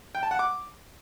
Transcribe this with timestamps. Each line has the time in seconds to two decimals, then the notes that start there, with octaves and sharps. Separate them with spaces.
0.15 G5
0.23 A5
0.31 F#5
0.39 D6